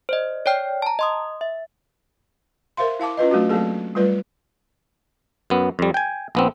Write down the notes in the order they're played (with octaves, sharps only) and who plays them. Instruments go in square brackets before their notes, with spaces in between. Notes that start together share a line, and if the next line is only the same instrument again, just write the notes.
[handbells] C5 D5 D#5
C#5 D5 G5 F6
A5 A#5
D#5 C6 D#6
E5
[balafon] A#4 C5 E5 F5 C6
E4 F5 A5 D6
C#4 F4 B4 D#5
F#3 A3 C4 D4 F4 F#4
F#3 A3 A#3 C4 G#4 A4
G3 A3 F4 B4 D5
[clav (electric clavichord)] F#2 B3
F2 G3
G5 G#5
A#1 B3 C4